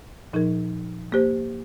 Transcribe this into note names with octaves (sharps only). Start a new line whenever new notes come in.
A#2 F3 D#4 A#4
A#3 G4 C5